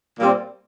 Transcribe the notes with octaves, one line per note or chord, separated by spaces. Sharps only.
A#2 G3 C4